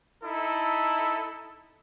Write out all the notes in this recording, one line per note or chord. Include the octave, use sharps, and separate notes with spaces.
D#4 E4 A4